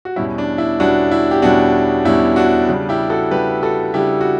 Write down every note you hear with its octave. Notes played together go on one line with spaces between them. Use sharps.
F#4
E2 B2 G3 C#4 E4
D4
E4
E2 B2 G3 C#4 D4 F#4
E4
G4
E2 B2 G3 C#4 D4 F#4
E2 B2 G3 C#4 E4
D4 F#4
C#3 G3 D4
E4 G4
F#4 A4
C#3 G3 D4 G4 B4
F#4 A4
C#3 G3 D4 E4 G4
F#4